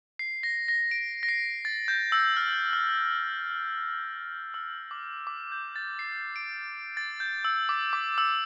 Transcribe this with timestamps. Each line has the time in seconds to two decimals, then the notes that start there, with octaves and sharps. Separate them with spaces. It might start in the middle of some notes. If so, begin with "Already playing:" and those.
0.19 C7
0.43 A#6
0.68 A#6
0.91 D7
1.23 A#6
1.29 C7
1.65 A6
1.88 G6
2.12 E6
2.37 F6
2.73 F6
4.54 E6
4.91 D6
5.27 D6
5.52 G6
5.76 A6
5.99 C7
6.36 D7
6.97 A6
7.20 G6
7.45 E6
7.69 D6
7.93 D6
8.18 E6